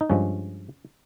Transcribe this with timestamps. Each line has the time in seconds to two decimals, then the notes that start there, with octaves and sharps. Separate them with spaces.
0.01 D#4
0.10 G2 F3 G#3 C#4